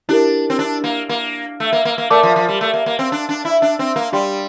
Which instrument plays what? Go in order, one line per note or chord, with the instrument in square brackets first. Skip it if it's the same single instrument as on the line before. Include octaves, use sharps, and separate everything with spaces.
[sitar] D4 [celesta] E4 G4 A#4
[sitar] C4
D4
A#3
A#3
A3
A#3
A#3
A#3
[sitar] A3 [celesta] A#4 D5 A5 D6
[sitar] F3
F3
G3
A3
A#3
A#3
C4
D4
D4
E4
D4
C4
A#3
[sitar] G3 [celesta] D4 G4 D5 G5 C6